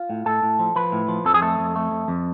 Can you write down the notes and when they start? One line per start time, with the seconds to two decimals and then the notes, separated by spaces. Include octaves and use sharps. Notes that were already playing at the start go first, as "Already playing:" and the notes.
Already playing: F4
0.10 A2
0.26 A2 A4
0.43 A2
0.59 F3
0.76 F3 B4
0.92 A2
1.08 F3
1.25 F2 A4
1.34 G#4
1.42 A3 A4
1.59 F2
1.75 A3
1.91 F2
2.08 F2